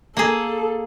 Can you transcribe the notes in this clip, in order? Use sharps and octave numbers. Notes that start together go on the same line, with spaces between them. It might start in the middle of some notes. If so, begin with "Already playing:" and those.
A#3 G#4 A4